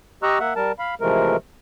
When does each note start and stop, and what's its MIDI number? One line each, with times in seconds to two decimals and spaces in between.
0.23 0.38 67
0.23 0.38 75
0.23 0.38 82
0.23 0.38 85
0.23 0.38 88
0.23 0.38 90
0.40 0.54 58
0.40 0.54 76
0.40 0.54 78
0.56 0.72 55
0.56 0.72 70
0.56 0.72 81
0.79 0.94 77
0.79 0.94 83
1.01 1.37 48
1.01 1.37 52
1.01 1.37 53
1.01 1.37 56
1.01 1.37 57
1.01 1.37 70